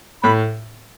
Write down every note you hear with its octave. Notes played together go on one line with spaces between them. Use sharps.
A2 B5